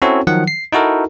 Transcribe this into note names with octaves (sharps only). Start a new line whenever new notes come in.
C4 C#4 E4 F#4 A4 C#5
D#3 F3 F#3 F#5
C7
D#4 E4 F#4 A4 A#4